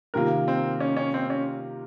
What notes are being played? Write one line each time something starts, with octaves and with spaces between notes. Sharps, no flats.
C3 D#3 A#3 F4 A#4
C4
C#4
C#4
C4
C#4